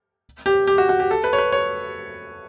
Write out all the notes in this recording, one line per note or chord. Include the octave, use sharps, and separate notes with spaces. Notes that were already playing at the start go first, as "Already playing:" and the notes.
G4
G4
F#4
F#4
G4
A4
B4
C#5
B4
C#5